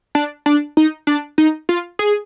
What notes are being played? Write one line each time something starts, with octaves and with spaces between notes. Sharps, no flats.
D4
D4
D#4
D4
D#4
F4
G#4